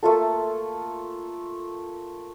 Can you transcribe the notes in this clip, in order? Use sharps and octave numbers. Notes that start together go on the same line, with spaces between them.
A3 A#3 F4 A4